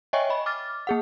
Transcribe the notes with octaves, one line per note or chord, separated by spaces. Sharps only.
C#5 D#5 E5 G5 G#5 C#6
D#5 B5
D6 F6 A6
A#3 G#4 F#5